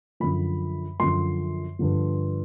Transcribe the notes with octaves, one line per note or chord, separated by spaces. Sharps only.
F#2 D3 F3 B5
F#2 D3 F3 C6
G2 D3 F3